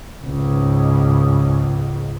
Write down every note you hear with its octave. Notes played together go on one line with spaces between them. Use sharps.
C#2 G#2